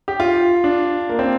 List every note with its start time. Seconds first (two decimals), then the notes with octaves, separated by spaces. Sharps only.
0.08 G4
0.20 F4
0.64 D4
1.09 A#3
1.19 C4